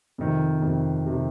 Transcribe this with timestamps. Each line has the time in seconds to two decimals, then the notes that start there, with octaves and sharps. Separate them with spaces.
0.18 F2 C3 D#3
0.62 F2 C3 D#3
1.05 F2 C3 D#3